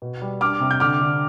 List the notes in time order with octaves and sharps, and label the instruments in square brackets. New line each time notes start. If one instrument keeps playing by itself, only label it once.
[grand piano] B2
G3
D4 D6 F6
C3
G6
D3 D6 F6
D3